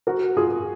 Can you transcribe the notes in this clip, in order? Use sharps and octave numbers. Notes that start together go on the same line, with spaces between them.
F#4 A#4
F4 G#4